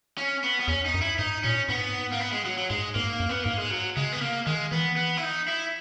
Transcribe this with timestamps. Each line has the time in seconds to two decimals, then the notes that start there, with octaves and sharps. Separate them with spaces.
0.18 C#4
0.44 B3
0.60 B3
0.68 E2 C#4
0.86 D#4
0.94 F#2
1.01 E4
1.19 G#2 D#4
1.43 A#2 C#4
1.69 G#2 B3
2.12 A#3
2.20 B3
2.32 G#3
2.45 F#3
2.58 F#3
2.70 G#2 G#3
2.95 G#2 A#3
3.20 F#2
3.29 B3
3.44 G#2 A#3
3.58 G#3
3.71 F#3
3.97 C#3 G#3
4.13 B3
4.21 A#3
4.47 D#3 G#3
4.72 E3 B3
4.97 B3
5.17 E4
5.23 D#4
5.48 E4